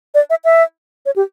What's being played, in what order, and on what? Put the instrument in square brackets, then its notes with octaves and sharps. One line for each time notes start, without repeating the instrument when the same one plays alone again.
[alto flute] D5
E5
E5
C#5
G4